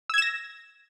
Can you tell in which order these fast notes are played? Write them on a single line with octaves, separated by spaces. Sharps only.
E6 G#6 E7 A#6